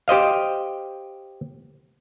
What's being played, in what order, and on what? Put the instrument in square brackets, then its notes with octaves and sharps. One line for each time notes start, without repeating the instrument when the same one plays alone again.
[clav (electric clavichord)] G4 C5 D#5 F5